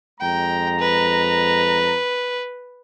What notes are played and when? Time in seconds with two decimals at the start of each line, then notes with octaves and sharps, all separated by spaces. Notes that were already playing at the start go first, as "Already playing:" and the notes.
0.20 F2 G#3 G5 A#5
0.79 B4